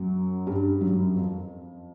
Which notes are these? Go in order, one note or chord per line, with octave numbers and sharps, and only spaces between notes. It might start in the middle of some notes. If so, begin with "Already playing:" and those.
Already playing: F#2 F#3
G2 G3
F#2 F#3
F2 F3